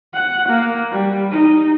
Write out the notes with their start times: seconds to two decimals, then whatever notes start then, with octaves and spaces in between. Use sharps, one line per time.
0.13 F#5
0.48 A#3
0.91 G3
1.31 D#4